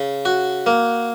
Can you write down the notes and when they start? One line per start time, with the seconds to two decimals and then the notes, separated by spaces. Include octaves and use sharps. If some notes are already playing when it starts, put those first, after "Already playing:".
Already playing: C#3
0.25 F#4
0.66 A#3